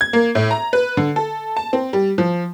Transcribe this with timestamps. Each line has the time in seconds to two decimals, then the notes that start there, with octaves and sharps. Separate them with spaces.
0.01 G#6
0.13 A#3
0.35 A2
0.51 A#5
0.73 B4
0.97 D3
1.16 A4
1.57 A5
1.73 C4
1.93 G3
2.18 F3